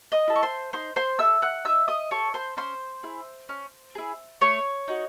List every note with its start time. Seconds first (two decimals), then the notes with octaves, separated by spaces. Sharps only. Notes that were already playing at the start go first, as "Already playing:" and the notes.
0.12 D#5 D#6
0.28 E4 A4
0.36 C#6
0.43 C5 C6
0.73 D#4 C5 C6
0.96 C5 C6
1.19 A4 E5 E6
1.42 F#5 F#6
1.65 D#4 E5 E6
1.88 D#5 D#6
2.11 A4 C#5 C#6
2.34 C5 C6
2.57 C#4 C5 C6
3.03 E4 G#4
3.49 C#4
3.95 E4 G#4
4.41 A3 C#5 C#6
4.88 D#4 F#4